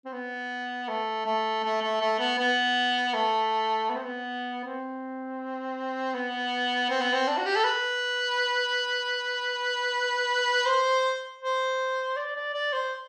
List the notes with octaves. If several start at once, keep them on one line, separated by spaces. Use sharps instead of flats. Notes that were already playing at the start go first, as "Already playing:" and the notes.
C4
B3
A3
A3
A3
A3
A3
B3
B3
A3
B3
C4
B3
C4
B3
C4
B3
C4
D4
F#4
G4
A4
B4
C5
C5
D5
D5
D5
C5